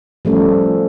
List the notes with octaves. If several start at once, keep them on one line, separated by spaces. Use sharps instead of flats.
F3 G3 A3 C#4